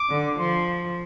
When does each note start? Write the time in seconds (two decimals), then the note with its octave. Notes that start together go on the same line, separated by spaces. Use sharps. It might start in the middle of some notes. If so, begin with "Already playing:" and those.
Already playing: D6
0.11 D3
0.39 F3 C6